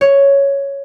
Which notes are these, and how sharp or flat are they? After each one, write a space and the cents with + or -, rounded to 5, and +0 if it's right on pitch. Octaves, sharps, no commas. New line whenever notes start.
C#5 +5